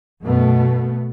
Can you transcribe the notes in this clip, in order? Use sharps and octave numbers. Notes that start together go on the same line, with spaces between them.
F#2 B2 A3 B3